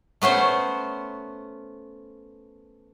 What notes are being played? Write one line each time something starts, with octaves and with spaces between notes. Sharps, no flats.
A3 B3 C#4 C5